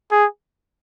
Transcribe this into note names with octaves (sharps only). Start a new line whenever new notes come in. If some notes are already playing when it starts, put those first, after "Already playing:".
G#4